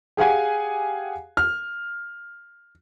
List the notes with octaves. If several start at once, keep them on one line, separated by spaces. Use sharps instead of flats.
G4 G#4 F5 F#5 G#5
F6